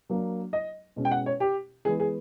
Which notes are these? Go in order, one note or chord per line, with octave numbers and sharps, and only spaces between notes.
F#3 A#3 D4
D#5
B2 G#3 C#4
G5
F#5
C#5
G4
E3 G#3 B3 G#4
G#4